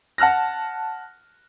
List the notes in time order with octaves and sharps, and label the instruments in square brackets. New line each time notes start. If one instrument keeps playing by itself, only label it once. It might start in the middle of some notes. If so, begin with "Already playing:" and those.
[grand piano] F#5 A5 F6 F#6 A#6